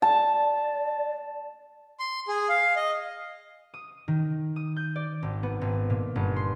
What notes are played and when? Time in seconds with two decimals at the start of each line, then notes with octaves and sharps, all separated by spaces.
0.02 D5 A5
2.00 C6
2.28 G#4
2.49 F5
2.76 D#5
3.74 D#6
4.08 D#3
4.56 D#6
4.76 G6
4.96 D5
5.23 G#1
5.43 B3
5.61 G#1
5.90 A#2
6.16 G1
6.36 C6